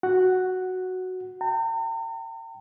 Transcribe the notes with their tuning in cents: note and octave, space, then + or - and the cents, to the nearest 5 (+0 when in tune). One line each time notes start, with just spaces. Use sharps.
F#4 +0 F#5 +0
G5 -15 A#5 -45